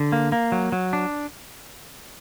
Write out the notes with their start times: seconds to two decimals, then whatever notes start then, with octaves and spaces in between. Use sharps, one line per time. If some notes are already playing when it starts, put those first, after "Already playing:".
Already playing: D3
0.12 A#3
0.32 A#3
0.52 F#3
0.72 F#3
0.93 D4